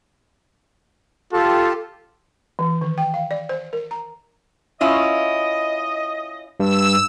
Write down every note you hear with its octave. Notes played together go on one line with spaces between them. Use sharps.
F4 G4 A4 A5
E3
D#3
G5
F5
D5
C5
A#4
A#5
C#4 E4 F4 D#5
G2 E6